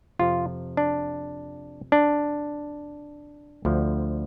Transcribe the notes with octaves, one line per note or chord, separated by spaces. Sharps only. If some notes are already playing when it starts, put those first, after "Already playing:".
F2 C3 F3 F4
D4
D4
D2 D3 F3